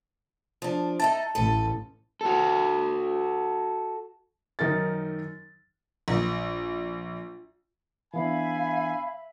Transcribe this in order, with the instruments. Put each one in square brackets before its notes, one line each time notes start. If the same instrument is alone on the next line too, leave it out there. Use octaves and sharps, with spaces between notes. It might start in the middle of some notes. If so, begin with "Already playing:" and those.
[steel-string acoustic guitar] F3 D4
[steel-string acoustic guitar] A3 D#4 A4 [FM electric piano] A5
[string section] A1 [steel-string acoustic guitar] A4 B4
[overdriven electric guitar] F#4 A4
[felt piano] F#2 D#3 D#4 A#4 A6
[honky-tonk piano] A#1
[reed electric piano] E3 B3 D4 [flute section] E5 B5 [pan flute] F5 [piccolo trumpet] G#5